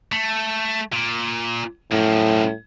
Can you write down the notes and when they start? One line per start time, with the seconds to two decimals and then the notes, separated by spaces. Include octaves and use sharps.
0.12 A3
0.92 A#2
1.92 F#2 A2 F3